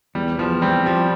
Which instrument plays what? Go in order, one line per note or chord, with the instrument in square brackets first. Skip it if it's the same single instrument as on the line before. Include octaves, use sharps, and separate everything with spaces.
[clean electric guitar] E2 [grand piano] G3
[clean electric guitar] E2 [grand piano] F3
[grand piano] G3 [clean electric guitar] C4
[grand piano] F3 [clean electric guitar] G3